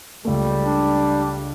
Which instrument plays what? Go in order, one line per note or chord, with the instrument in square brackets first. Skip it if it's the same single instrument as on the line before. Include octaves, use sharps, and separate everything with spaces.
[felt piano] C#2 A3 [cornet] G3
[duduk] D4